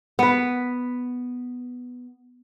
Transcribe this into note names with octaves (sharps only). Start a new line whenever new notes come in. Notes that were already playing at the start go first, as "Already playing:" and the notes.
B3 B4